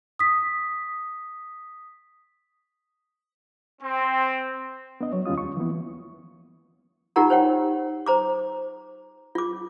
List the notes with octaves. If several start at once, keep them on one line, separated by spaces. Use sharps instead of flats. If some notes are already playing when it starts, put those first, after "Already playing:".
D#6 B6
C4
B3 D4 D#5
F#3 C#5
D#2 G3 C#4 F4 D#6
C#6
E3 F3 A#3 B3 E4
D#4 F4 G4 A#4 F#5 A#5
C5 C#5 F#5 G5
C5 A#5 D6
F4 D6